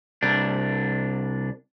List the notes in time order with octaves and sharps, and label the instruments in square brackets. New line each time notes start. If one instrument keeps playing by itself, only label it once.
[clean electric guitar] C2 D4